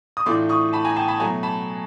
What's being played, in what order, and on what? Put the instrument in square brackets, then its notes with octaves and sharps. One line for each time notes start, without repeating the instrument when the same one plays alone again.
[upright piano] D#6
A2 E3 A3 D4 F4 C6 D6
C#6 D#6
A5 B5
G#5 A#5
G5 A5
A5 B5
B2 F#3 A3 G#5 A#5
A5 B5